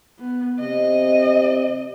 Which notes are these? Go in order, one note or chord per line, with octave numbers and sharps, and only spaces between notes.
B3
C3 D#5